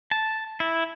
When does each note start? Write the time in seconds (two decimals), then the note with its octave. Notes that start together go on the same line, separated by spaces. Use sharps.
0.11 A5
0.60 E4